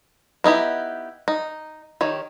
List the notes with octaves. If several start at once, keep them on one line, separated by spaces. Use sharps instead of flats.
B3 D#4 E4 G4
D#4
D#3 G4 C#5